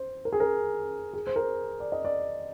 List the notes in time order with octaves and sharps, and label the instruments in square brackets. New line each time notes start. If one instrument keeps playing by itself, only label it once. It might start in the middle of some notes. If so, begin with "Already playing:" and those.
Already playing: [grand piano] C5
A#4
G#4
A#4
G#4
C5
A#4
D5
D#5
D5